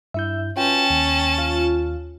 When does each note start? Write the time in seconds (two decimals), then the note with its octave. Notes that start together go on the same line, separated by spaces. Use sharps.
0.14 G2 E4 E5 G6
0.57 C#4 F4 F#4 B4 G5 A5
0.90 D#2
1.38 F4